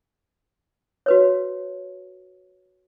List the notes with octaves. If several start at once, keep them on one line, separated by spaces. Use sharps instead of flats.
F#4 B4 C#5